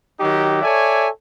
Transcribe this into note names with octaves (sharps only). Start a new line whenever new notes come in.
D#3 F#3 D#4 G4
A4 C#5 D5 E5 G#5